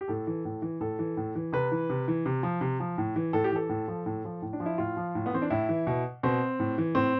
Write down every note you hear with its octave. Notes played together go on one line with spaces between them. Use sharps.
G4
A2 A4
E3
A2
E3
A2 A4
E3
A2
E3
C3 B4
E3
C3
E3
C3
F3
C3
F3
A2
E3
A2 A4
G4
E3 A4
A2
F3
A2
F3
A2
D4
F3
E4
A2 F4
F3
A2
B3
E3 C4
D4
A2 E4
E3
B2
B2 C4
A2
E3
A2 C4